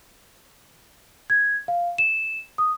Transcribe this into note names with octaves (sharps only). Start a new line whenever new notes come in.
G#6
F5
E7
D#6